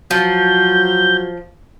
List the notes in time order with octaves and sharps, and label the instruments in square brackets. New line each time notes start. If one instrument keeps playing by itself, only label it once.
[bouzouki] F3 [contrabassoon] F#3 [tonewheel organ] G6